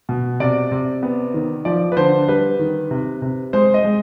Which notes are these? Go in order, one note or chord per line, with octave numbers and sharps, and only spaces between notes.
B2
C3 D5
C3
B3
D#3
F3 D5
B4
D3 C5
G3 B4
D#3
C3
C3
G#3 C5
D#5
G#3